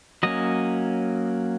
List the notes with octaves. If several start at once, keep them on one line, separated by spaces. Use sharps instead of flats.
F#3 A#3 C#4 D#5